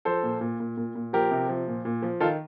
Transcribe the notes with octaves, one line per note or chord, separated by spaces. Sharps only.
F3 A4 C5
A#2
A#2
A#2
A#2
A#2
F3 G4 A#4
C3
F3
A#2
A#2
F3
D#3 F4 A4